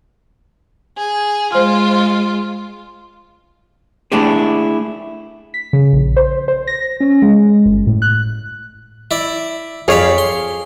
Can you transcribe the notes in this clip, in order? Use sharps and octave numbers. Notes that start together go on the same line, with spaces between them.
G#4
G#3 F4 C5 F6
A3 D4 E4 G4 G#4
B6
C#3
A#1
C5
C5
A#6
C#4
G#3
G1
A2
F#6
E4 D5
F2 G#4 C#5 D5 F5 B5
C6